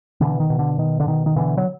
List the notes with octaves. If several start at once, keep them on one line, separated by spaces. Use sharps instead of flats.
B2 D3 E3
D#3
B2
D3
B2 D#3
D3
B2 D#3
D#3
B2 D3 E3
F#3